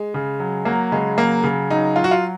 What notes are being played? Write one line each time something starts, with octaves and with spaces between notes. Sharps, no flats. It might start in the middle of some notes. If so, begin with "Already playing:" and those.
Already playing: G#3
C#3
F#3
F#3 A#3
C#3 G#3
F#3 A#3
C#3
F#3 D#4
F#3 F4
F#4
F4